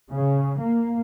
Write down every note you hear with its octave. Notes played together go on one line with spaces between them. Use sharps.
C#3
A#3